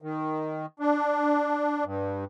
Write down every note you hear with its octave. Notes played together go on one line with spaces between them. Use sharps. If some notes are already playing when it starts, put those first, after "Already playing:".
D#3
D4
G2